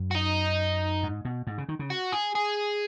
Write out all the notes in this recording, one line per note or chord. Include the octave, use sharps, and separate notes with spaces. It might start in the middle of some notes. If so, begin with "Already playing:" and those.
Already playing: F#2
F#4
D#4
G#2
B2
G#2
C#3
D#3
C#3
F#4
G#4
G#4